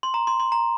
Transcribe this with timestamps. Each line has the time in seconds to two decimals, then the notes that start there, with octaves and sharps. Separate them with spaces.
0.03 C6
0.14 A#5
0.27 C6
0.40 C6
0.52 A#5